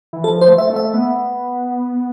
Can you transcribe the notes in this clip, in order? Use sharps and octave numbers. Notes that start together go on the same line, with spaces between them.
E3
F3 A4
C5
A3
E5
A3
E5
B3